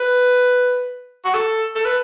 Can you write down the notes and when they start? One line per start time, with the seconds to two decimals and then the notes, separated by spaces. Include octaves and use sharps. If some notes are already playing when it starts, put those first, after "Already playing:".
Already playing: B4
1.25 F#4
1.34 A4
1.75 A4
1.85 B4